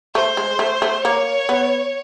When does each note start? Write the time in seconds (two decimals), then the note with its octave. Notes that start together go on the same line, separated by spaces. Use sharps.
0.15 A3 C5
0.37 G#3
0.59 A3
0.82 A3
1.04 A#3 C#5
1.49 B3